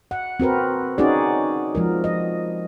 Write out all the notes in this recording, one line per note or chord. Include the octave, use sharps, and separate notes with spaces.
F#5
C4 F#4 A#4 B4
C#4 D#4 F#4 G#4 D5
F3 G#3 A#4
D#5